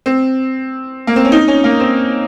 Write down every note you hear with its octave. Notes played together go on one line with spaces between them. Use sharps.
C4
A#3
C4
C#4
D#4
C#4
A#3
C4